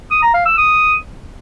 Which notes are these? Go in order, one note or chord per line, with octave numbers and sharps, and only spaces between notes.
D#6
A#5
F5
E6
D#6